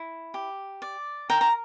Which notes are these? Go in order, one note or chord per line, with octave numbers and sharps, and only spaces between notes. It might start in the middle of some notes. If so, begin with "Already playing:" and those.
Already playing: E4
G4
D5
A#4 G5 A#5
A#5